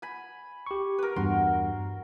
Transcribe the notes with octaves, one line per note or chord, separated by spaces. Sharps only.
G#5 B5
G4 C#6
A#4 B4
E2 G2 F#4 C6